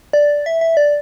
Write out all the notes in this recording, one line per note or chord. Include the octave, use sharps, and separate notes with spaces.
D5
E5
E5
D5